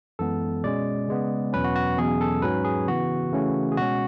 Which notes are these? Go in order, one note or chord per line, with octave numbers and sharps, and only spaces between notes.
F#2 E3 G#3 B3 A4
B2 G#3 C#4 D5
C#3 G#3 B3
E2 B2 F#3 C#4 B4
F#4
F#4
E2 B2 F#3 C#4 G#4
A4
G#2 F#3 C#4 B4
G#4
C#3 E3 B3 F#4
C#3 E3 A3 C#4
G#4
B2 G#3 C#4 F#4